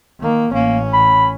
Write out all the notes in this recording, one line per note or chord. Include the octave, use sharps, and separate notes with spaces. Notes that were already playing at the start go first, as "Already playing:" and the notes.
D#3 A#3
A1 A#3 C#4
B5